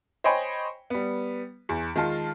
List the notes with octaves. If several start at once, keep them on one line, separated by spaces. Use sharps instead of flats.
C5 C#5 D#5 G5 G#5 B5
G3 B3
E2
D#3 G#3 F4 A5